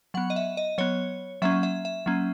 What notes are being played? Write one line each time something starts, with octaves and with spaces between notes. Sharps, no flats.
F#3 B3 F#5
D#5
E5
D#5
F#3 B3 C#5
F#3 A#3 C#4 E5
E5
E5
F#3 A#3 C#4